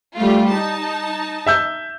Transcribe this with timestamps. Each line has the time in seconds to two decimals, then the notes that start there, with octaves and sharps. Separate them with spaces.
0.17 G3 A3 F4
0.51 D#4 A5
1.46 E5 E6 G6